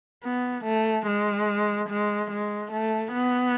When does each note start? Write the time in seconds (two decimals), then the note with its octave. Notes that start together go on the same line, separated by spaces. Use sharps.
0.24 B3
0.65 A3
1.06 G#3
1.88 G#3
2.31 G#3
2.71 A3
3.13 B3